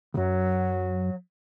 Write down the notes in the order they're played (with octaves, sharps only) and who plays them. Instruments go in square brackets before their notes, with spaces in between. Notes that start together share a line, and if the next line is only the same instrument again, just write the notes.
[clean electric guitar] C2 F#2 [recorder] F#3